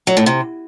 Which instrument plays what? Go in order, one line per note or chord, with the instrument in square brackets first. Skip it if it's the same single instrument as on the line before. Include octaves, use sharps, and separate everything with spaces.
[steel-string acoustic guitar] F#3
A2
C3